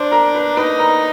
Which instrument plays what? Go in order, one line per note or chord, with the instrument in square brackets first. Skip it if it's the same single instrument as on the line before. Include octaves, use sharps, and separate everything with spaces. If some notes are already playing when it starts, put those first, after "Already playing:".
Already playing: [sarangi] D4 [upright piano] C5 C6
[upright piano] A#4 A#5
B4 B5
[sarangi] D#4 [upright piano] B4 B5
[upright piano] A#4 A#5